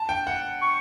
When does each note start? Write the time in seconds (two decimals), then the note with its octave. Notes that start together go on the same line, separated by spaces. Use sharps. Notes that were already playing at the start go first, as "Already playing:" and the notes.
Already playing: A5
0.09 G5
0.27 F#5
0.61 C#6